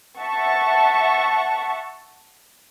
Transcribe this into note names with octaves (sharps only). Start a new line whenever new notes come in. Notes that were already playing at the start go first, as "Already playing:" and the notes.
E5 F#5 A5 C#6